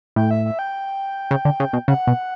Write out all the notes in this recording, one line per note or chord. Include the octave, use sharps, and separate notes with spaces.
A2 G5
E5
E5
G5
C#3
D3
C#3
B2
C#3 F#5
B2